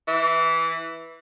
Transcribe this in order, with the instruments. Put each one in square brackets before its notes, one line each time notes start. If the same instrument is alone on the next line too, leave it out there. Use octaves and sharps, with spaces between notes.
[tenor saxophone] E3